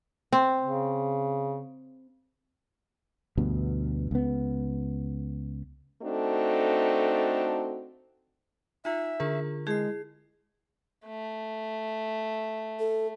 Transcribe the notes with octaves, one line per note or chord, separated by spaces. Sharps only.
C4
C#3
D2 G2 B2
C#2 B3
A3 C4 D4 D#4 F#4 A4
D#4 F4 E5
D3 F4 G#4 A#4
G#3 E4 G#4 C7
A3
A4